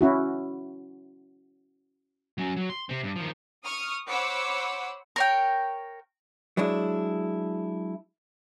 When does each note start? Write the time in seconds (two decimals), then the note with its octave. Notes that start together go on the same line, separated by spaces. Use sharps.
0.01 C#4 E4 F#4
2.38 F#3 C#4
2.56 F#3
2.70 C6
2.89 C3 C4
3.03 G2
3.16 D#3 F3
3.64 C#6 D#6 F6
4.09 C5 C#5 F#5 B5 D6 E6
5.16 A#4 C#5 G5
6.57 F#3 G#3 D4 E4